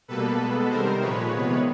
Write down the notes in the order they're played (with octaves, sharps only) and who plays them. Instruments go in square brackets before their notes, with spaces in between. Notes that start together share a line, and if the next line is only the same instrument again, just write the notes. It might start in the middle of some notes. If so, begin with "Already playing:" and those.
[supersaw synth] B2 G3 A#3 A4 B4
B2 G#3 B3
C3 D#3 G3 A#4 C5
A#2 F3 G#3 B4 C#5
C3 D#3 G#3 B3